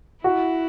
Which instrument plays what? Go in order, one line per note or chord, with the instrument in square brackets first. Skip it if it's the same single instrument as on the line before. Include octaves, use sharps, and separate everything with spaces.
[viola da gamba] E4 [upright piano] F#4